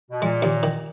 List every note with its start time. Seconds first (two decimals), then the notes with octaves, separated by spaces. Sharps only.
0.11 B2
0.22 A#2 G#3
0.42 D#2
0.63 D#3